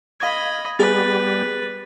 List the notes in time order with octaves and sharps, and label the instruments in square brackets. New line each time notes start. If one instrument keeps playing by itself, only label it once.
[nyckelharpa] D#5 B5 [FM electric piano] F5 G#6
[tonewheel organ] G3 B3 G4 [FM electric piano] G#4 A6 [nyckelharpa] B4